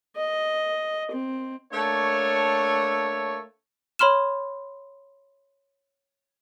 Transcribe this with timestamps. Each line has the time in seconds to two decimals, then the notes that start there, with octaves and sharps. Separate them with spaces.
0.16 D#5
1.12 C4
1.73 A3 A#3 D4 C#5
3.99 C#5 B5 C6 F6 E7